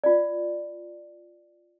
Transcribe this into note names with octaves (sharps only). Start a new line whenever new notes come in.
F4 D5